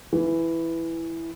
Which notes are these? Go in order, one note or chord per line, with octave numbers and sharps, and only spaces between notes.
E3